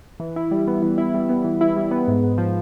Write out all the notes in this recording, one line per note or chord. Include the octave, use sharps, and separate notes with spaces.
E3
E4
G3
B3
E3
E4
G3
B3
E3
E4
G3
B3
G#2
G#2
F3